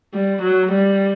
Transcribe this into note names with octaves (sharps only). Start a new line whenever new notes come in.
G3
F#3
G3